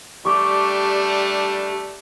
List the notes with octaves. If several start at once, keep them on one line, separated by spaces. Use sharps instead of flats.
G3 A3 D4 G4 C#6 D6